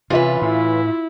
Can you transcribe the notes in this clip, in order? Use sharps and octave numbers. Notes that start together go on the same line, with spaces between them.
C3 E3 C#4 F4 B4 E5
A2 E4